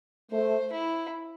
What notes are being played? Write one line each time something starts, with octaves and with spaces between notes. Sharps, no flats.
A3 C5
E4